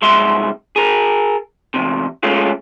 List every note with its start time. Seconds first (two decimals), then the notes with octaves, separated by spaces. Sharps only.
0.02 C2 G#2 G#3 E5 C6
0.76 G#4 A#4
1.74 E2 G#2 C3
2.23 G#3 A3 C#4 F4